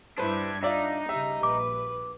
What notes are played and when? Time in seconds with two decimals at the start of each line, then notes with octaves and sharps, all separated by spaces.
0.18 G2 D4 E4 G4 B4 C5 G#6
0.63 D4 D#4 F4 D5 E5
1.09 C#3 G3 E5 A#5
1.43 A#1 B4 D6